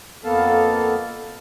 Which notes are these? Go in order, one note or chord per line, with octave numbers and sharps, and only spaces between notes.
F2 A#3 B3 A4 F5 A5